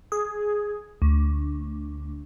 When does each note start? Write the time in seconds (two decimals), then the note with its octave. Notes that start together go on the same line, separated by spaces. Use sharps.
0.12 G#4
1.02 D2